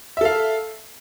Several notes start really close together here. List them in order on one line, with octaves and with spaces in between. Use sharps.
E5 A4 F5